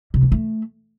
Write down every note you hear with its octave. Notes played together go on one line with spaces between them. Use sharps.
C3
E3
A3